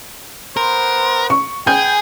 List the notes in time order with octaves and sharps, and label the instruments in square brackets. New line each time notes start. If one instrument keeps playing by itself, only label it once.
[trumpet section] B3 C5 [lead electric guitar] A#4
[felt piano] C#6
[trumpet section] B3 G5 G#5 [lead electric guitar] G#4 [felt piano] G6